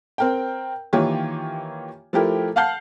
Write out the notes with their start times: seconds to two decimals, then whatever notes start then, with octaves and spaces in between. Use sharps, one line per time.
0.18 C4 A#4 G5
0.93 D#3 E3 A#3 F4 G4 C#5
2.13 F3 A3 E4 G4 A#4
2.56 F5 F#5 A5 F6 G6 C7